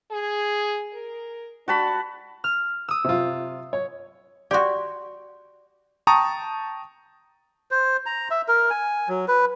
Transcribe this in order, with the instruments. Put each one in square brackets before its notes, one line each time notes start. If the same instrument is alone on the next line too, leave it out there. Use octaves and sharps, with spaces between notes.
[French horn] G#4
A#4
[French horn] D4 [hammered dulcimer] F#4 A5 B5
[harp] F6
D#6 E6
[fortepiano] C3 F4
C#5
[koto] F#4 G4 [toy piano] D5 C6
[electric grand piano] G5 A5 A#5 C#6 D#6
[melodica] C5
A#5
E5
A#4
G#5
F#3
B4